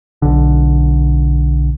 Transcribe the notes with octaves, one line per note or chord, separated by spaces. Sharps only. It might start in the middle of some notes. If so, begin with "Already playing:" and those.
B1 D3